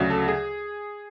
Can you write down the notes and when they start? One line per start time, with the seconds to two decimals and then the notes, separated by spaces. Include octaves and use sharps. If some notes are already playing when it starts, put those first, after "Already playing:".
Already playing: D2 C#3 F#3
0.10 A4
0.28 G#4